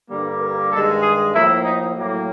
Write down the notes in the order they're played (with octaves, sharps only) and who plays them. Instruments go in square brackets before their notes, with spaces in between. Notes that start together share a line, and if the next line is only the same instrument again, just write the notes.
[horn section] G2 D3 G3 A#3
A#4
G2 D#3 G#3 A4
G#4
A2 F3 A#3 E4
D#4
A2 F#3 A#3